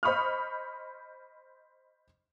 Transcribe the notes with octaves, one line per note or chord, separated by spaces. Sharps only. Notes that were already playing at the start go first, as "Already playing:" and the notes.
C5 D#5 B5 C#6 D#6 F6